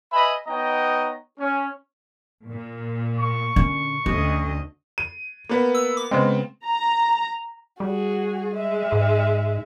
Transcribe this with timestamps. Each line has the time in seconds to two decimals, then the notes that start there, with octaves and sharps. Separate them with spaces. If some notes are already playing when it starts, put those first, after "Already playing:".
0.13 B4 D#5 E5 G#5 B5
0.47 B3 D#4 C#5 D#5 G5 A#5
1.40 C#4
2.48 A#2
3.18 C#6
3.56 D3 C#4
4.06 D2 C#4 D#5
4.98 D#7
5.49 A#3 B3 B4
5.75 E6
5.97 D6
6.11 C#3 G#3 B3 C4
6.66 A#5
7.80 G3 F#4 G#4
8.55 G#3 E5
8.92 G#2